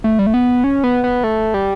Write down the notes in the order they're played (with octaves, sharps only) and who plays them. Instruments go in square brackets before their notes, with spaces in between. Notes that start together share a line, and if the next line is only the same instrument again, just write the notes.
[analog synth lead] A3
G3
A3
B3
C#4
B3
B3
A3
G3